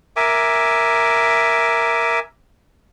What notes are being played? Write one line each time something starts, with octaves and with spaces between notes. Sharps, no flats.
A#4 E5 G#5 D6